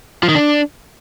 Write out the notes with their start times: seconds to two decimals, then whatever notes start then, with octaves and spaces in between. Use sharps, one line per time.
0.23 F3
0.29 D#3
0.35 D4